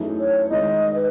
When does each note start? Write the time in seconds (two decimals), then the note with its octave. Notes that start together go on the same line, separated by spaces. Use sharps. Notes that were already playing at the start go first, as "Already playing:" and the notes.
Already playing: F#2 E3 A3 D#4 G#4
0.20 C#5
0.50 D#3 G#3 D#4 D#5
0.95 B4